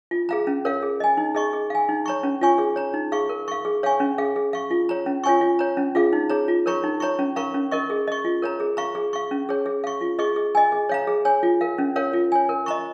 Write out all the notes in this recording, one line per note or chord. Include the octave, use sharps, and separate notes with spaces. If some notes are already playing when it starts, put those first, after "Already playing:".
F4
G#4 F5 A#5
C#4
A#4 C#5 F5
G#4
D#5 G#5
D#4
G#4 D#5 C#6
G#4
F5 G#5
D#4
C#5 A#5 C#6
C#4
F4 C#5 G#5 C#6
G#4
C#5 A#5
D#4
G#4 F5 C#6
A#4
F5 C#6
G#4
C#5 F5 G#5 C#6
C#4
G#4 F5
G#4
F5 C#6
F4
C#5 A#5
C#4
F4 C#5 G#5 C#6
F4
C#5 A#5
C#4
F4 G#4 F5
D#4
G#4 C#5 A#5
F4
A#4 C#5 A#5 C#6
D#4
C#5 A#5 C#6
C#4
A#4 F5 A#5 C#6
C#4
A#4 D#5 C#6
G#4
D#5 C#6
F4
A#4 C#5 A#5
G#4
F5 A#5 C#6
G#4
F5 C#6
C#4
G#4 C#5
G#4
F5 C#6
F4
G#4 D#5 C#6
G#4
D#5 G#5
G#4
C#5 F5 A#5
G#4
C#5 G#5
F4
A#4 F5
C#4
A#4 C#5 F5
F4
C#5 G#5
A#4
D#5 A#5 C#6